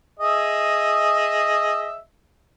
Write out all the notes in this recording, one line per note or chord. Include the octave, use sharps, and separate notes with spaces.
G#4 D#5 E5